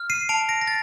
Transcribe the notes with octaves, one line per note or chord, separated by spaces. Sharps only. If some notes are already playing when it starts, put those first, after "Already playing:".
Already playing: F6
C7 D#7
A5 D7 F7
A#6 D7
A#6
A6